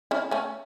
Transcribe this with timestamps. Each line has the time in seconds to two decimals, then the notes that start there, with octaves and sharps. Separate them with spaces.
0.11 C#4 E4
0.31 A3 C#4